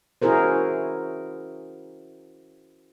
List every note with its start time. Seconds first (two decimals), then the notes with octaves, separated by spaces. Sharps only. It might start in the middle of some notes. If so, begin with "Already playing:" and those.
0.22 C#4 E4 F#4 G#4 A#4 C5